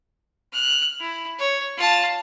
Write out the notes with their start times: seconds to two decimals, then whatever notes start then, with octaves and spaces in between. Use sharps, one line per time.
0.53 F6 F#6
1.00 E4
1.39 C#5
1.77 F4 A5